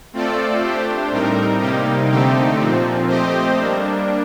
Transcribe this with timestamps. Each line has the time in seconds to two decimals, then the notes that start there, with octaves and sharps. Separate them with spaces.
0.13 A3 C4 F4 A4 D5
0.62 A3 D4 G4 C5
1.11 A2 G3 C4 D#4 A#4
1.61 C3 G3 A#3 D#4 G4
2.10 D3 A3 C4 D#4 G4
2.59 A#2 F3 C4
3.08 A3 C4 G4 C5 D#5
3.58 G3 A#3 D4